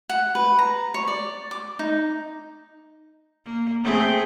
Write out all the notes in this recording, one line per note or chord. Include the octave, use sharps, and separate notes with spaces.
F#5
B4
A#5
C#5
D5
D6
D#4
A#3
A3 C4 G#4